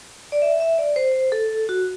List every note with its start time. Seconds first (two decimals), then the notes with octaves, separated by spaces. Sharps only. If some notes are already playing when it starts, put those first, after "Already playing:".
0.32 D5
0.42 E5
0.60 E5
0.78 D5
0.96 C5
1.32 A4
1.69 F#4